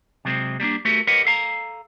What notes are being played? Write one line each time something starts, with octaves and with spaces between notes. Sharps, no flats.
C3 F#3 G#3 C4
G3 A#3 C#4 D4
A3 B3 F#4 G4 A4 A#4
G4 A#4 B4 C#5 D#5 F#5
A4 F5 A#5